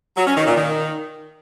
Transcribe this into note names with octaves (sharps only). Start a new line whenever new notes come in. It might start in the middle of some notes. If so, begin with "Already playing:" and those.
F#3
C#4
D#3
A#2
D#3